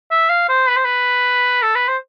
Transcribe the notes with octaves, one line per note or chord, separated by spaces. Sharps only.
E5
F5
C5
B4
C5
B4
A4
B4
C5